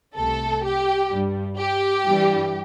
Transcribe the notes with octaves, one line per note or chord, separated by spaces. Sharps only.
C2 C3 A3 A4
G4
G2 G3
G4
G2 E3 G3